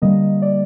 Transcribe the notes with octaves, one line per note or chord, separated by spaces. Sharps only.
D3 G3 A#3 D#5
D5